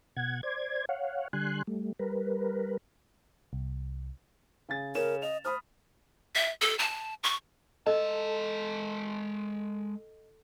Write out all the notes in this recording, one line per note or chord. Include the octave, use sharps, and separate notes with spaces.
B2 F#5 G#6
C5 D5 G#6
C#5 F5 F#5
D3 G3 G#5 C6 F#6
G3 A3
G3 A#4 B4
C2
C#3 G#5 A6
C#3 C#4 A#4 E7
D#5 F7
C5 B5 D#6 F6
E5
A4
A5
C#6
G#3 A4 D#5 A5